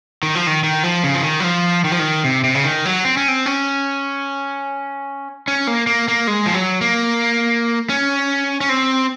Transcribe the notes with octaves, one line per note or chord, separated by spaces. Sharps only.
D#3
F3
D#3
D#3
F3
C#3
F3
D#3
F#3
F3
D#3
F3
D#3
C3
C3
C#3
D#3
F#3
C4
C#4
C4
C#4
C#4
A#3
A#3
A#3
G#3
F3
F#3
A#3
C#4
C#4
C4